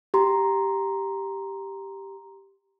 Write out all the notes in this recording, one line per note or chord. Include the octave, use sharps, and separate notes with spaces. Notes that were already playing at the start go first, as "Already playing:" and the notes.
G4 A#5 C6